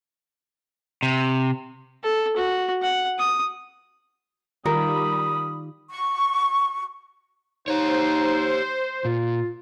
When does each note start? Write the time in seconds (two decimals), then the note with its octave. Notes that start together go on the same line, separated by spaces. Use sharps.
1.03 C3
2.03 A4
2.36 F#4
2.82 F#5
3.19 D#6
4.66 D#3 G3 F4 G4 A#4 B5 D#6
5.90 C#6
7.68 D#4 G4 C5 C#5
9.05 A#2 F4